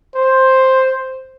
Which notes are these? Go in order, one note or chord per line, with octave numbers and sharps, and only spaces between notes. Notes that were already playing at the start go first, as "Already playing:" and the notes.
C5